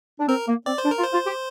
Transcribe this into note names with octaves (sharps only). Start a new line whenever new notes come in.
D4
C4 A#4
A#3
C4 D5
C5
D4
A#4
F4
C5
F4
G4